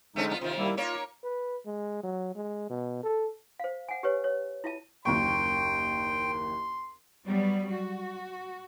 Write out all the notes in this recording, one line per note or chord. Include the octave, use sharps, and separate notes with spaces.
D3 G#3 A3 C4 C#4 D#4
B3 D4 F4
C3 D#3 F4 C5
G3 A#3 E4
A#3 F4 C#5
B4
G#3
F#3
G#3
B2
A4
C5 F5
F#5 G#5
G4 B4 C#5
C#5
E4 F4 E5 A5
F#1 D#2 G5 C6 C#6
F#3 G3 B3
F#4